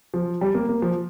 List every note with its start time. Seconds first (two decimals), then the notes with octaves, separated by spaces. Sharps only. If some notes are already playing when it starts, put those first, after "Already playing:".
0.14 F3
0.41 G3
0.55 A#3
0.69 A#3
0.82 F3